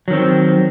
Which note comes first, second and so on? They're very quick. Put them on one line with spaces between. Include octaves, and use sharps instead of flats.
F#3 D#3 C4